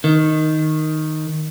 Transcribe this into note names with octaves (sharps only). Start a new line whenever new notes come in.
D#3